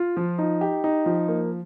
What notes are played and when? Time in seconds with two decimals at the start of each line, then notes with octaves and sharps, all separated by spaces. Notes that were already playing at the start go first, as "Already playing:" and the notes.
Already playing: F4
0.17 F3
0.39 D#4
0.61 G4
0.84 D#4
1.06 F3
1.28 A#3